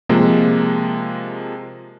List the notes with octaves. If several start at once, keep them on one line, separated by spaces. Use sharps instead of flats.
C3 F3 G#3 A#3